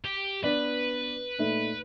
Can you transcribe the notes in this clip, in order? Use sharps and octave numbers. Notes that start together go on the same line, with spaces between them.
G4
B3 D4 B4 D5
A#2 A3 D#4